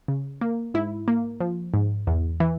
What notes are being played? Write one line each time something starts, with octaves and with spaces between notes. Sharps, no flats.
C#3
A#3
G#2 E4
A#3
F3
G#2
E2
E3